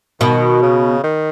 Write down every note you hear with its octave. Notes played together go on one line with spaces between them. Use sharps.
B2 D#3
C#3
D#3